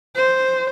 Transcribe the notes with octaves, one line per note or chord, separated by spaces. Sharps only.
C5